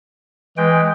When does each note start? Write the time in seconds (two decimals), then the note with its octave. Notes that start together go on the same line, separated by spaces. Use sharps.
0.57 E3 G#3 G5